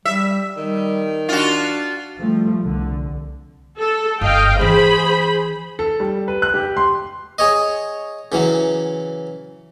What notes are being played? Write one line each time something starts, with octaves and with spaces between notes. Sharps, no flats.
G3 E5
D#3 G3
D4 F4 F#4
F3 G3 A3
C2 D3
A4
G1 D#5 F5 G5
E3 C4 G#4 C5 B5
A4
G3
B4
F#6
G4
C6
G#4 C#5 D#5
C#3 E3 F#3